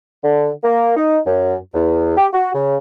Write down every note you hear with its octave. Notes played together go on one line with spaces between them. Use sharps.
D3
A#3
D#4
F#2
E2
G4
F#4
C#3